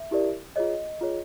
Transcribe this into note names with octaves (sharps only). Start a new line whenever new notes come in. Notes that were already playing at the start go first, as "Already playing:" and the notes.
Already playing: E5
E4 G4 A#4 D5
F4 G#4 C#5 D#5
F4 G#4 C#5